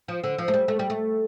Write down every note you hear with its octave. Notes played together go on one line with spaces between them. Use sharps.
F3
D3
F3
A3
G3
A3
G3
A3